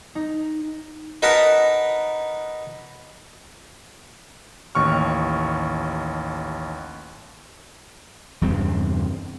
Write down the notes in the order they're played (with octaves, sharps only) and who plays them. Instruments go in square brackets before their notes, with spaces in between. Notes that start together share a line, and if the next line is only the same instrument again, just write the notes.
[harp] D#4
[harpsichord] D#4 A#4 B4 F#5 A5 A#5
[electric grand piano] A1 D#2 C#6 F6
[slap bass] E2 G2 C#3 C4